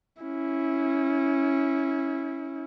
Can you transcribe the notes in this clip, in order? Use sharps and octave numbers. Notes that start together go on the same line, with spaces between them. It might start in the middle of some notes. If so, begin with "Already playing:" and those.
C#4 E4